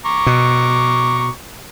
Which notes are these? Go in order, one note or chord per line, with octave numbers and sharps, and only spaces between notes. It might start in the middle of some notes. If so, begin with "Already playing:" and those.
A#5 C#6 D6
B2